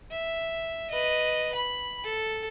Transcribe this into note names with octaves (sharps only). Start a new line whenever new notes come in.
E5
B4 D#5
B5
A4